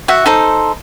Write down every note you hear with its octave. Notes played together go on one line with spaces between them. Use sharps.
F#4 E5 F#5
D#4 A4 C5